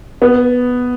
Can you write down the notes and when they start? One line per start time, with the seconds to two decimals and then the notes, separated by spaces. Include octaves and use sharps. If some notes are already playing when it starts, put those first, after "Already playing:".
0.22 B3